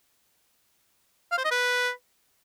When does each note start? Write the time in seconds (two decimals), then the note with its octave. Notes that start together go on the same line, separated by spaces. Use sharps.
1.31 F5
1.38 C5
1.45 D#5
1.51 B4